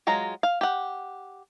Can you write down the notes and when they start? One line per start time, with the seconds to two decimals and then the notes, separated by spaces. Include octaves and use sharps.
0.07 F#3 G#3 F4 A#5
0.43 F5
0.61 G4 F#5